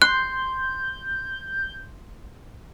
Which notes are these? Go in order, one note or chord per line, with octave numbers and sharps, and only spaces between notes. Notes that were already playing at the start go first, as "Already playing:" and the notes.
C6 F#6 G6